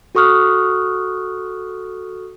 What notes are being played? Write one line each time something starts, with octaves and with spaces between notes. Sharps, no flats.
F#4 A4 C#6 D#6 F6 F#6